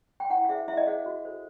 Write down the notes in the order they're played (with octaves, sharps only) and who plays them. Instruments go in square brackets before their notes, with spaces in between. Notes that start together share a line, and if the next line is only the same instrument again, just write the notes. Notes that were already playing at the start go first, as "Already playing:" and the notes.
[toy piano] G5
E4 F#5
F5
G#4 C5 E5
E4 E5
D#5
G#4 C5 F5
F#4
A4 C5